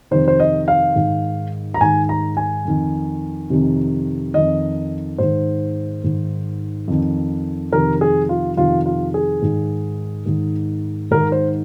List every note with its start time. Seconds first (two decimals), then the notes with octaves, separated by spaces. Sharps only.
0.11 F2 C3 D#3 C5
0.28 C5
0.40 D#5
0.68 F5
0.95 G#2 D#3
1.74 A#5
1.81 G#2 D#3 G#5
2.09 A#5
2.37 G#5
2.65 F2 D#3
3.50 F2 C3 D#3
4.34 F2 D#3 D#5
5.18 G#2 D#3 C5
6.04 G#2 D#3
6.88 F2 D#3
7.73 F2 C3 D#3 A#4
8.01 G#4
8.29 F4
8.57 F2 C3 D#3 F4
8.86 F4
9.14 G#4
9.42 G#2 D#3
10.26 G#2 D#3
11.11 G#2 D#3 A#4
11.32 C5